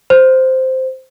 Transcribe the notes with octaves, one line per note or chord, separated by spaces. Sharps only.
C5